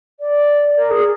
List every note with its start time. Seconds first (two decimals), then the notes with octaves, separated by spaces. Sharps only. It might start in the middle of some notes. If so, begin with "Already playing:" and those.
0.20 D5
0.77 A#4
0.91 G#4